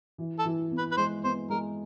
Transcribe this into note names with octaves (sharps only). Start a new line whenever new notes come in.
E3
A4
E3
B3
B4
B4
G#3 C5
B3 C5
G#3 A#4